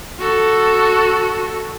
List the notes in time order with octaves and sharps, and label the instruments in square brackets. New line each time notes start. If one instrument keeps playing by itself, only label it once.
[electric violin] F#4 A4